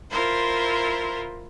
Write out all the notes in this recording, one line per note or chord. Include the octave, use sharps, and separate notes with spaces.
E4 F4 A#4 C5